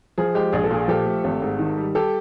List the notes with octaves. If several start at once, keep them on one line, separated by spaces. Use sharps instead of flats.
F3 G#4
G#3 G4
A#1 G#4
A4
A#2 G#4
F3 G4 A4
A3
G#1
G#2
D#3
G3
G4 A4